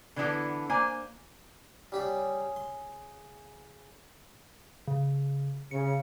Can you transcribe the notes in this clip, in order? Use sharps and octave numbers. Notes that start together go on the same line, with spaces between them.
D3 E3 B3 D4 E4 A4
A#3 D4 C5 G#5
C#3 G3 G4 G#4 D5
C6
C#3
C#3 C#7